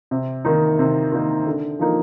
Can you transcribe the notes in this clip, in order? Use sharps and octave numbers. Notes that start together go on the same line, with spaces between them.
C3
D#3 A#3 D#4
C3
D#3 A#3 D#4
D3
F3 A#3 D#4